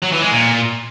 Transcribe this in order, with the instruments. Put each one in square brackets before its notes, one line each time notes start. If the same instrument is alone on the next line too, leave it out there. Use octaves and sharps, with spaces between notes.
[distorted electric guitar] F#3
E3
G#3
A#2